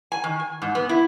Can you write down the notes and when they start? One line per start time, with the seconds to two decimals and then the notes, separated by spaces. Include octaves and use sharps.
0.12 G#5
0.24 D#3
0.40 G#5
0.62 G#2
0.75 B3
0.89 E4